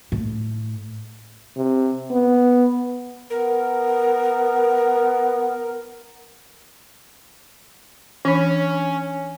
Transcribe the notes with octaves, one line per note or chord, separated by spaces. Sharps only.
A2
C3
B3
B3 A#4
E3 C#4 D4